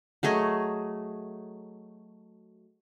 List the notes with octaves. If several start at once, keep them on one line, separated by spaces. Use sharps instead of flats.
F#3 A3 G#4 D#5